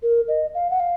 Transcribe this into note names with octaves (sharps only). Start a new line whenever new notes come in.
A#4
D#5
F5
F#5
F5